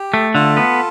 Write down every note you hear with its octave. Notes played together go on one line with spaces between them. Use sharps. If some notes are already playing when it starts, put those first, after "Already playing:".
Already playing: G4
A3
D3 F4 A4
B3